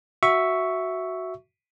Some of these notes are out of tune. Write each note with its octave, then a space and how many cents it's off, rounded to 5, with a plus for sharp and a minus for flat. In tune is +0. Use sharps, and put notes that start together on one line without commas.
F#4 +0 E5 +0 C#6 +5